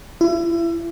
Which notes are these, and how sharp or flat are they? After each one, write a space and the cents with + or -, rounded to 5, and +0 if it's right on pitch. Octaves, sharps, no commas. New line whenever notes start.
E4 +35